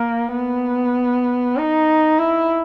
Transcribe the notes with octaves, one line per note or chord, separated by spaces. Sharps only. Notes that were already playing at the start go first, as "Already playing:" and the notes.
Already playing: A#3
B3
D#4
E4